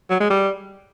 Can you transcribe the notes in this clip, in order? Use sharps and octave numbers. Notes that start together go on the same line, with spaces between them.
F#3
G#3
G3